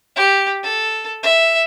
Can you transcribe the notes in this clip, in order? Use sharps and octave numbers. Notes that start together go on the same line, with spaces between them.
G4
A4
E5